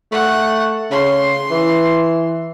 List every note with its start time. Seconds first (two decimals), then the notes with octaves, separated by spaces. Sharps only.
0.12 A3 F#5
0.91 C#3 C6
1.51 E3